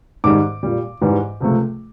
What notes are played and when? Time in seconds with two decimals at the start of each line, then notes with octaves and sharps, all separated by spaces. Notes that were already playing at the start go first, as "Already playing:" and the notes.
0.24 G#2 D#3 G3 D6
0.63 A#2 G3
1.01 G#2 E3 G3
1.40 C#2 C3 F3 A3